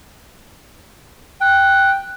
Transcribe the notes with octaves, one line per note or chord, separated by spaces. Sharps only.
G5 F#6